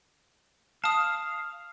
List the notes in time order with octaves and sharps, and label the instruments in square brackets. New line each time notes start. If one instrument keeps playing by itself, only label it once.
[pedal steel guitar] F5 [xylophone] A5 D#6